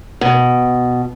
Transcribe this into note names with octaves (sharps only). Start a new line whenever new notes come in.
B2